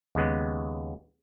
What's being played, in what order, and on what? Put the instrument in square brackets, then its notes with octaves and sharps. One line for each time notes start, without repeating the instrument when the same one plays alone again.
[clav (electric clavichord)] D#2 C#3 G#3 B3